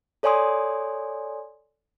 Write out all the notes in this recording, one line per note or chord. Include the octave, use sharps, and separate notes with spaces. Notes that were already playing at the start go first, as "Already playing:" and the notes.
A4 C#5 D5 G#5 C6 D#6